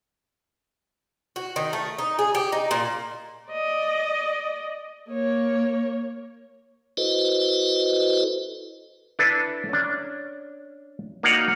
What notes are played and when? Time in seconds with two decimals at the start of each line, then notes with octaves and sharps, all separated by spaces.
1.36 F#4
1.56 D#3
1.73 A3
1.98 D#4
2.19 G#4
2.35 G4
2.52 D#4
2.71 A#2
3.50 D5 D#5
5.09 A#3 C#5
6.97 E4 F#4 A4 B4 C5 D#5
9.19 D4 E4 A4 B4
9.69 C#4 D4
11.23 A#3 D#4 F#4 D5 F5 F#5